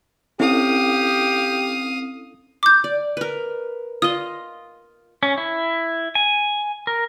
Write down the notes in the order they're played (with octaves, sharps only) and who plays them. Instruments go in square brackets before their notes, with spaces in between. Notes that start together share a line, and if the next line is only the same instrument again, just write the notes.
[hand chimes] C4 [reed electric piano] C#4 E4 A4 [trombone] G4 [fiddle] F5 D#6
[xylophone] D6 G6
[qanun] D5
A#4 B4
[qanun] F4 D#5 [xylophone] D#6
[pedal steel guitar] C#4
E4
G#5
A#4